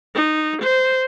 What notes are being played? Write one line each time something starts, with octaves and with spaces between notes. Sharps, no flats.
D#4
C5